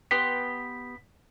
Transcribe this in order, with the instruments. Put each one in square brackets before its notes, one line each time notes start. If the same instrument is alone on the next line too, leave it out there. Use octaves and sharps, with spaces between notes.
[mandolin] B3 G4 C6 [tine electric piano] B6